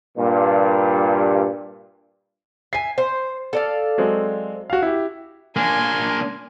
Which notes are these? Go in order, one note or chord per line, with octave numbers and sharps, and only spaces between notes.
G2 A#2
E5 G#5 C7
C5
A4 D5 F5
F#3 G#3 C4
F#4 F5
E4 G4
A#3 D4 G#5 C6